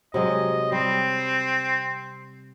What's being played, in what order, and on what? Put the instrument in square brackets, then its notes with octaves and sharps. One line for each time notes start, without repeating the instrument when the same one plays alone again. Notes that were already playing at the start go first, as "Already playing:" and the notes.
[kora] C3 F#3 G#3 [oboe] D#5
[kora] G3 [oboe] C4